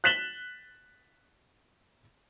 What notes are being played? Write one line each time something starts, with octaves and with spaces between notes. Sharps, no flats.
F#6 A6 B6 E7 F#7 G7